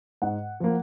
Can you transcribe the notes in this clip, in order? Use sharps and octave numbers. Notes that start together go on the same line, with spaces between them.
G#2 F#5
F3 A#3